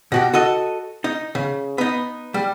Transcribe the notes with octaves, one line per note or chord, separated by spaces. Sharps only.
B2 F#4 G4
F#4 A4 D#5
D#4
C#3
B3 D#4
G3